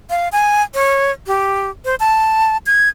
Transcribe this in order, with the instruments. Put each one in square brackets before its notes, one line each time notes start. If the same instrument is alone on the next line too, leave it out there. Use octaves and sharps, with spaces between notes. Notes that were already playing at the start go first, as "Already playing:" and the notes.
[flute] F5
G#5
C#5
G4
C5
A5
G#6